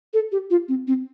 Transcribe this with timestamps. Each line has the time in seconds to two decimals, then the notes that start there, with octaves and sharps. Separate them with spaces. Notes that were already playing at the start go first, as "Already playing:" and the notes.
0.14 A4
0.32 G4
0.50 F4
0.69 C4
0.87 C4